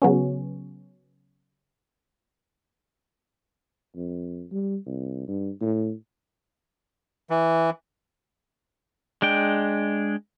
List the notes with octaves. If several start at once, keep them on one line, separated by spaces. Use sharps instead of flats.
C#3 F#3 B3 C#4
F2
G3
C2
G2
A2
E3
G#3 D4 G5